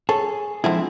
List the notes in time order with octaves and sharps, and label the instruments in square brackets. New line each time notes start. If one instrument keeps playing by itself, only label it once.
[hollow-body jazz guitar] G#4 [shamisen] A4 C#5
[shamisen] D3 C4 G#4 [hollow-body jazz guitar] F3 G#3 E4